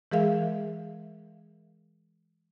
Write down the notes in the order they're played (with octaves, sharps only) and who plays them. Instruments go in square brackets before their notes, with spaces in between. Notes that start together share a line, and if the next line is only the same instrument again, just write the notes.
[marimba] E3 G#3 G#4 A#4 E5 F5